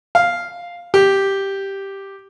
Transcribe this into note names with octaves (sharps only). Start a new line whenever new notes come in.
F5
G4